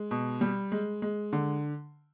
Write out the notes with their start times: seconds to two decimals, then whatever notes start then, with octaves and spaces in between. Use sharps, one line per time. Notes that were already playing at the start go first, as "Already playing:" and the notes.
Already playing: G#3
0.11 B2
0.41 G3
0.72 G#3
1.02 G#3
1.33 D3